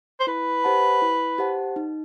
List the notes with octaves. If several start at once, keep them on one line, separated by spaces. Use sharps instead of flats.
C5
E4 B4
G4 C5 F#5 A5
E4
G4 C5 F#5 A5
D#4